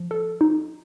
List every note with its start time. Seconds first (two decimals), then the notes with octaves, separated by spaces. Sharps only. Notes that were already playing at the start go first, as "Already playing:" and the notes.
Already playing: F3
0.11 A4
0.41 D#4